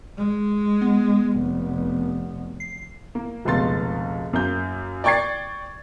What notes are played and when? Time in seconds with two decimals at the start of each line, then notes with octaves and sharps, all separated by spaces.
0.17 G#3
0.81 B3
1.38 F1
2.60 C7
3.15 A#3
3.45 F1 C#2 B2 C6 A6
4.33 F#2 A#3 G6
5.04 D5 G5 C#6 G#6 A6 C7